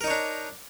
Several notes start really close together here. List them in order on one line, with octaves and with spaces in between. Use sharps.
A#4 D#4 C#5 D4